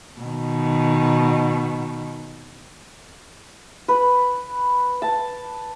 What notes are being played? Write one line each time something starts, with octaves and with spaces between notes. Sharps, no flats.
B2 D#3
B4
A5